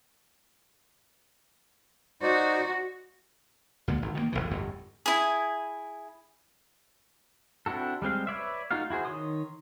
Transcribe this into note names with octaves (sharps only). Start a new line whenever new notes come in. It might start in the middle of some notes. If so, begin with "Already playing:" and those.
D#4 F#4 C5 D5
D2 A#2 D3 G#3
G#1
D#3 F3 A#3
E1 B1 C3 E3
G1 F2 A2
E4 G#4
C4 D4 E4 F#4 A4
G3 G#3 C4 F5
B4 C#5 D5 E5
A3 D#4 F4 F#4 F5
E4 F#4 G#4 C5
D#3 C#5 C6 D#6